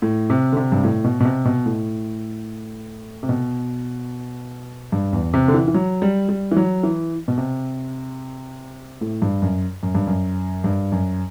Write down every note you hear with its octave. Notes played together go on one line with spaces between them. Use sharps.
A2
C3
D3
C3
G2
A2
B2
B2
C3
B2
A2
C3
B2
G2
E2
C3
D3
E3
E3
F#3
G3
G3
E3
F#3
E3
B2
C3
A2
G2
F#2
F#2
G2
F#2
G2
F#2